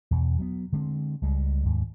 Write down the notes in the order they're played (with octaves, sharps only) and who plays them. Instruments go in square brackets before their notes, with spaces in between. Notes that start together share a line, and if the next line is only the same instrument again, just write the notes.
[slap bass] E2 B2
F#3 G3 B3
D3 G#3 A#3 C4
C#2 G3 G#3
D#2 G#2